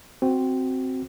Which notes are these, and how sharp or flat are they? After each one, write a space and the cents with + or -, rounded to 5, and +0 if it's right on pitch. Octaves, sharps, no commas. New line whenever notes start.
C4 +0 F#4 +5